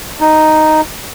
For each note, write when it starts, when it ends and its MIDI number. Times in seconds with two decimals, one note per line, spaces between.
0.20 0.81 63